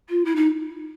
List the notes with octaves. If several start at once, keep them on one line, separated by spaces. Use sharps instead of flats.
F4
E4
D#4